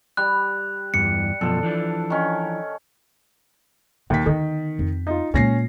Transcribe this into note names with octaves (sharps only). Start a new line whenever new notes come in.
G3 F#6
E2 G2 E3 C#7
F#2 B2 F3 A4
E3 F3 D4
D#3 C#4
D#2 A#2 D#3 B6
D3 D#3 B3
F2
D#4 F4
A#2 G#3 C#4 A#6 C7